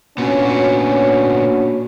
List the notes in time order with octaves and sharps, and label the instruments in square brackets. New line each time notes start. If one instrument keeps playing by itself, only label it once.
[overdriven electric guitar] A#2 B3 [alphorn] C#4 [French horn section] D4 F#4 C#5